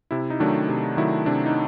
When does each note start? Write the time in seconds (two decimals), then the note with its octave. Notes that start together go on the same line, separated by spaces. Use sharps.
0.11 C3 E4
0.30 D#4
0.40 D#3 F#3 A3 D4
0.69 C3
0.97 D#3 F#3 A3 E4
1.26 C3 D4
1.46 D#4